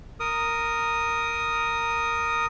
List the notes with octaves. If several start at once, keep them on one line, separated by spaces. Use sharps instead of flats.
A#4 D#6